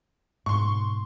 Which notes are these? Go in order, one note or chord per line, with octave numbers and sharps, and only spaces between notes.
G#2 B2 C6 C#6